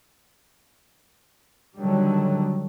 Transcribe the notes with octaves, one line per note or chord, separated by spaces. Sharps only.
D3 D#3 F#3 G3